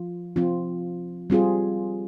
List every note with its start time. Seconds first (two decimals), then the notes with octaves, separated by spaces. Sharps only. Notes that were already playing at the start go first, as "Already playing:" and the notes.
Already playing: F3 F4
0.36 F3 C4 F4
1.30 G3 C4 F4 G#4